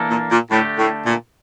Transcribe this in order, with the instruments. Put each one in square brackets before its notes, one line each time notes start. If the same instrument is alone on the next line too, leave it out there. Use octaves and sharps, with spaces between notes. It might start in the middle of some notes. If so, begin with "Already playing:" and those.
Already playing: [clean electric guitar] E3 A#3 D4 A4
[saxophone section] A#2
A#2
[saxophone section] A2 [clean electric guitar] D3 A3 D4 G4
[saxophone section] A2
A#2